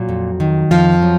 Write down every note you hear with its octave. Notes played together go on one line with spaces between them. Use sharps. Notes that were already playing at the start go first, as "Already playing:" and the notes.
Already playing: A#2 F#3
F2
D#3
F2 F3 F4
F#3